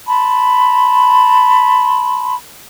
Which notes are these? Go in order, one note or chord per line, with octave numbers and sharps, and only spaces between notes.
A5 B5 C6